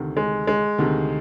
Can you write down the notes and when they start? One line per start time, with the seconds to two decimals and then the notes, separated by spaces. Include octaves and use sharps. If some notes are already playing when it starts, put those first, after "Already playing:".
Already playing: D2 C3 D#3
0.17 G#3
0.47 G#3
0.78 D2 C3 D#3